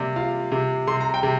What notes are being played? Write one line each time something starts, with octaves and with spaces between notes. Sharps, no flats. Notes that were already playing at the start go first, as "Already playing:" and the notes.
Already playing: C3 A#3 D5
F4 F5
C3
C3 C6
A#5
G5
C3